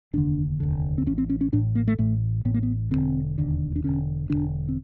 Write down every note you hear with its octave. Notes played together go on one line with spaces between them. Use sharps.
F1 D#2 D3 D4
F1 D#2 D3
C4
A1 A2 C#4
C4
C#4
C#4
A1 A2 D4
A#3
A3
A1 A2 A3
A1 A2 B3
A#3
B3
E1 D#2 D3 C4
E1 D#2 D3
D4
E1 D#2 D3 C#4
E1 D#2 D3 D4
C4